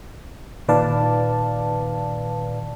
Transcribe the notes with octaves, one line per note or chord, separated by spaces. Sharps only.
A#2 D#3 B4 D5 F5 A5